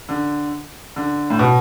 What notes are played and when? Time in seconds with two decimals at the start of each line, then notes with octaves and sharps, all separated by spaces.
0.09 D3
0.96 D3
1.30 A2
1.39 B2